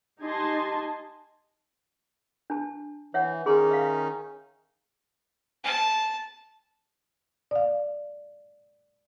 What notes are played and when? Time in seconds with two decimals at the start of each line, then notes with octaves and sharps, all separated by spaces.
0.22 D#4 G4 D#5 G#5 A5 C6
2.50 D4 A5
3.14 E3 C#5 E5 F#5
3.46 D#3 C#4 D#4 G#4 C6
3.71 E5 F5
5.64 A5
7.51 D5 F5